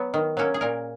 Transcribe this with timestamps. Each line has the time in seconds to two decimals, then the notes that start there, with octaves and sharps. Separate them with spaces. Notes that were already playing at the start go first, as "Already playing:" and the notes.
Already playing: F#3 B3
0.14 D#3
0.37 F#3 A#3 C#4
0.54 G#4
0.61 A#2 A#4